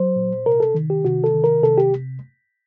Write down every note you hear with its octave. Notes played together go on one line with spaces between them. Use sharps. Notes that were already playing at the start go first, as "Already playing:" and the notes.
Already playing: F#3 C5
A#2
C3 A#4
A4
D#3
G4
C3 F#4
A4
D#3
A#4
C3 A4
G4